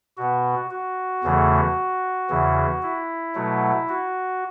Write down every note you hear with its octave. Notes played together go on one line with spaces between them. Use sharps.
B2 B3 F#4
F#4
E2 C#3 E3 A3
E2 C#3 E3
E4
B2 F#3 A3
F#4